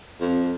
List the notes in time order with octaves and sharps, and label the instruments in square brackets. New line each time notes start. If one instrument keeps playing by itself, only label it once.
[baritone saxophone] F2